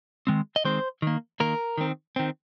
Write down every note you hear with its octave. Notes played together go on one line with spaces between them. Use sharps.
D#3 G#3 C4
D#5
D#3 G#3 C4 C5
D#3 A#3
D#3 A#3 A#4
D#3 C4
D#3 C4